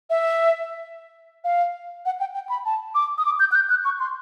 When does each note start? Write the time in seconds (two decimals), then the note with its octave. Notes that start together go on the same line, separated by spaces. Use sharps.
0.10 E5
1.44 F5
2.06 F#5
2.20 G5
2.34 G5
2.50 B5
2.65 A5
2.95 D6
3.18 D#6
3.25 D6
3.40 G6
3.52 F#6
3.55 G6
3.70 F#6
3.85 C#6
4.00 C6